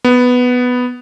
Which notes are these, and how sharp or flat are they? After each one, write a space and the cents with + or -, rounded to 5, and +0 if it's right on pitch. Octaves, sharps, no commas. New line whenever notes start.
B3 +5